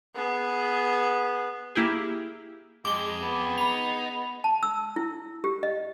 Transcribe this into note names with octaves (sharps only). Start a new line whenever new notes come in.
B3 G#4
A#3 E4 G4 G#4
F2 G#3 G#4 D6 G7
B3
D#4 B5 F7
A5
E6
E4
G4
D#5